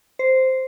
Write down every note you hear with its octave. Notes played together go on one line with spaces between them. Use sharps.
C5